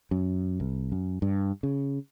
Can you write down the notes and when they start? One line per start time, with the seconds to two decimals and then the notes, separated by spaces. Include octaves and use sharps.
0.11 F#2
0.60 C2
0.92 F#2
1.22 G2
1.63 C#3